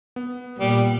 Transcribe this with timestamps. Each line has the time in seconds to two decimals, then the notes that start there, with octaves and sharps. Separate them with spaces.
0.16 B3
0.59 A#2 G3 A#3